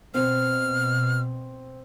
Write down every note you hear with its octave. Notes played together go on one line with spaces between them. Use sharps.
B2 C4 F6